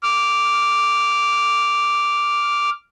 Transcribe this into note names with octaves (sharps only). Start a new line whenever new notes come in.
D6 F6